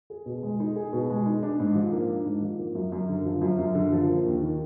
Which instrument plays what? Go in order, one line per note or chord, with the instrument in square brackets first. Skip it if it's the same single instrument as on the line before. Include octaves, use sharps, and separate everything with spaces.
[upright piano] G#4
B2
G#3
D#4
G#4
B2
G#3
D#4
D4
G#2
F3
A#3
D4
G#2
F3
A#3
F#2
F#2
D3
F3
F#2
F#2
D3
F3
A#3
D#2
D#3